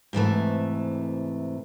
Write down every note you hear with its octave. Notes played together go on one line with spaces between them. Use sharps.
G#2 C3 E3 A3